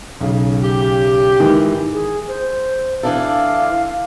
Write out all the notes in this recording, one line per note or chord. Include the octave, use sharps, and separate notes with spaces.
B1 C#3
G4
G#2 D#3 E3
G#4
C5
E3 D4 A4 F5